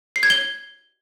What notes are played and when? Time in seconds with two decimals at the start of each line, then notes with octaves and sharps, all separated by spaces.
0.16 C7
0.23 G#6
0.30 G7